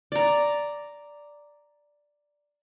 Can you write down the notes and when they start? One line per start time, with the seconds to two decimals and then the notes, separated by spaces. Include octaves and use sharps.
0.12 D5 A#5